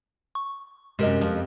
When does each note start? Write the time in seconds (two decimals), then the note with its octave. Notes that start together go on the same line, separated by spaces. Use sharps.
0.35 C#6
0.99 F#2 C3 G#3 A#4 D#5
1.21 F2